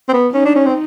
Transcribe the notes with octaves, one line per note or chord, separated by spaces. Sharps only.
C4
B3
C#4 D#4
D4
C#4
C4